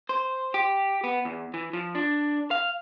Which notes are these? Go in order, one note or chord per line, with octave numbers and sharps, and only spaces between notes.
C5
G4
B3
E2
E3
F3
D4
F5